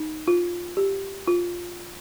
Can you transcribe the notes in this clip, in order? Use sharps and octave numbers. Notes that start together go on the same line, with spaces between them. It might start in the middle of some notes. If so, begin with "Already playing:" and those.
Already playing: D#4
F4
G4
F4